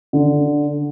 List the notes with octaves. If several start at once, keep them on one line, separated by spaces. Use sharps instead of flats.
D3